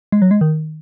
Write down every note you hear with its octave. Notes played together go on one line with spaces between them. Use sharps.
G#3
F#3
G#3
D#3